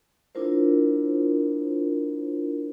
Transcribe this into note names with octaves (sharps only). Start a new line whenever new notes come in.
D4 E4 F4 A#4 C5